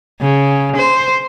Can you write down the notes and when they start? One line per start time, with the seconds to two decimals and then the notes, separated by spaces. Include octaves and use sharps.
0.21 C#3
0.76 C5